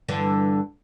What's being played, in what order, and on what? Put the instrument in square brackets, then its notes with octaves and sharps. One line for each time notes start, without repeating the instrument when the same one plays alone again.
[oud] G2 D3 E3